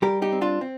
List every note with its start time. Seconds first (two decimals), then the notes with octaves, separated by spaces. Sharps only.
0.02 G3 G4 A#4
0.22 D#4 G4
0.32 C4
0.41 D4 F4
0.61 C4